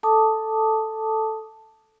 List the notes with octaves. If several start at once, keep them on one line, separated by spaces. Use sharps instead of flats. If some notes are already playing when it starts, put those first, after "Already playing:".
A4 A5 D6 D#6